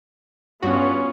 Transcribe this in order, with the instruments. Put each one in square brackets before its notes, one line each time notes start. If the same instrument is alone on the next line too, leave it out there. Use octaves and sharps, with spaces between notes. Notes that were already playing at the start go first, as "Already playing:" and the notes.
[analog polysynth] G2 F#4 [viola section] B3 C#4 F4